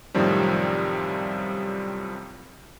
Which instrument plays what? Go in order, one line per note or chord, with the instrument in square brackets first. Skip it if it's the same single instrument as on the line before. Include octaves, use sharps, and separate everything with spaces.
[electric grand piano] F#2 A2 C3 D#3 F3 G3